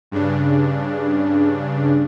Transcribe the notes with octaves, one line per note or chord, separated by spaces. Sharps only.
G2 C#3 D4